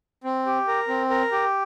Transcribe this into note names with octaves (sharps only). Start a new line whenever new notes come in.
C4
G4
A#4
C4
A#4
G4